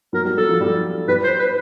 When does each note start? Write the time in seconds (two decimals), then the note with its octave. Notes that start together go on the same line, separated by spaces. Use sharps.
0.13 F#3 A#4
0.25 G3
0.37 F#3 A4
0.49 F3
0.61 G3
1.08 G3 B4
1.24 C5
1.39 B4